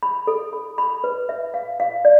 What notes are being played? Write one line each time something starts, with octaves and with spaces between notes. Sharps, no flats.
B5
A4
B5
B5
B4
E5
F5
F5
D5